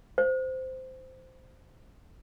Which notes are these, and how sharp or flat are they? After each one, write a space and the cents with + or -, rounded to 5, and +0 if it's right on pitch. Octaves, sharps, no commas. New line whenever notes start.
C5 -10